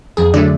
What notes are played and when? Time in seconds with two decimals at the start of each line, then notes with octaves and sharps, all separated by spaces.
0.17 F2 G#4
0.34 D3 F#3 A3 D5